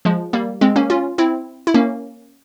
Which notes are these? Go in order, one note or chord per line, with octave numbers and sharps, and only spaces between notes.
F3 G#3
G3 A#3
G#3 C4
A#3 C#4
C#4 F4
C4 E4
E4
A#3 C#4